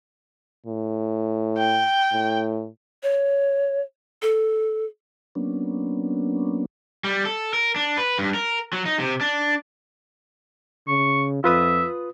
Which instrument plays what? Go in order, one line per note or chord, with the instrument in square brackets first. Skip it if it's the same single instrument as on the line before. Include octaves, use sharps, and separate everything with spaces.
[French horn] A2
[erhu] G5
[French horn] A2
[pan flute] C#5
A4
[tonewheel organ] F#3 A#3 B3 C#4 D4
[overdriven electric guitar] G3
A4
A#4
D4
B4
G2
A#4
F#3
D#4
C3
D4
[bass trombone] C#3 [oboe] C#6
[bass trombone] F2 [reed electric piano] F4 B4 D#6 [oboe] E5